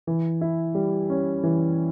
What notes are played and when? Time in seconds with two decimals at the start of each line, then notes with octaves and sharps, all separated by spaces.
0.07 E3
0.41 E4
0.75 G3
1.10 C#4
1.44 E3